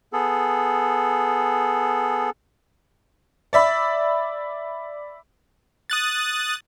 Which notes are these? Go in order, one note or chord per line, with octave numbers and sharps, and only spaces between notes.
B3 G#4 A4
D5 E5 B5
D#6 F#6 A6